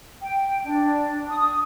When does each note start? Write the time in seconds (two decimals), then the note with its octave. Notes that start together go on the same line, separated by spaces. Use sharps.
0.22 G5
0.64 D4
1.28 D#6